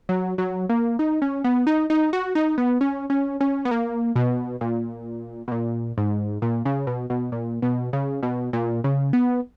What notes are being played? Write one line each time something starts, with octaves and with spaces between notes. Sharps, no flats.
F#3
F#3
A#3
D#4
C#4
B3
D#4
D#4
F#4
D#4
B3
C#4
C#4
C#4
B3
A#3
B2
A#2
B2
A#2
G#2
A#2
C#3
B2
B2
A#2
B2
C#3
B2
A#2
C#3
B3